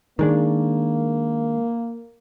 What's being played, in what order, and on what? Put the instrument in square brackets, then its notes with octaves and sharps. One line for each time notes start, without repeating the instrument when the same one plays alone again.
[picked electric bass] D#3 G#3 D4 [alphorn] A#3